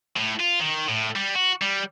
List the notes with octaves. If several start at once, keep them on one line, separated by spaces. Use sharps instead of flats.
A2
F4
D#3
A2
G3
F#4
G3